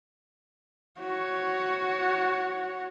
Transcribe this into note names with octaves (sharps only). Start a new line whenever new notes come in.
F#4 C#5